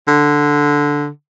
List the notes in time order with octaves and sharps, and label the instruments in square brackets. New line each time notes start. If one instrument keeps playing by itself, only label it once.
[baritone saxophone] D3